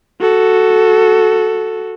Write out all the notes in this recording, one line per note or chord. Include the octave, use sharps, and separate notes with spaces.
F#4 A4